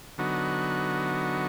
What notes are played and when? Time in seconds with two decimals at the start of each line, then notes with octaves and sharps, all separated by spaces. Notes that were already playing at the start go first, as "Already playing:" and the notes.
0.18 D3 F#3 B3 D#4 F#4